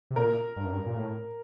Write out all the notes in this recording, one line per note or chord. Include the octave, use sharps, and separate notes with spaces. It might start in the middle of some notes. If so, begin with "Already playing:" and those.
C3
A#2 A#4
G2
F#2
G2
A#2
A2